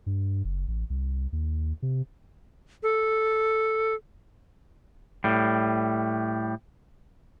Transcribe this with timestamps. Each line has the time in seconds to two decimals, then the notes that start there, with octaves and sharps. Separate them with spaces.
0.06 G2
0.45 F#1
0.68 A1
0.90 C2
1.32 D#2
1.82 C3
2.83 A4
5.24 A2 G3